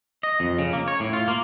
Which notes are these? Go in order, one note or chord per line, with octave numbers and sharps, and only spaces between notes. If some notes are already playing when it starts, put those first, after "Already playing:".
D#5
F2
C#3
A#3
C#5
A2
F4
A#3